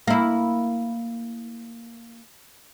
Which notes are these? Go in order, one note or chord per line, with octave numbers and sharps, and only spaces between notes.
A#3 E4